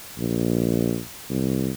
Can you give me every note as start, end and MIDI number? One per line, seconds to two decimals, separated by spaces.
0.18 1.00 34
1.30 1.71 36